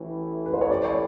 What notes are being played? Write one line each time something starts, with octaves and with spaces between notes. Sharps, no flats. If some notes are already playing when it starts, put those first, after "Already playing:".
Already playing: A1 A2 E3
B4
C5
C#5
D5
C#5